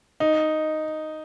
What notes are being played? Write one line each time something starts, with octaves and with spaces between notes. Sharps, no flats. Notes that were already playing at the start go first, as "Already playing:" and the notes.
D#4